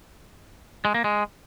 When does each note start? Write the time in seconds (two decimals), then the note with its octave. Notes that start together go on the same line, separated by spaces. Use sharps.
0.85 G#3
0.94 A#3
1.04 G#3